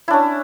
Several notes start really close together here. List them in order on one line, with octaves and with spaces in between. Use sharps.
E4 D4 C#4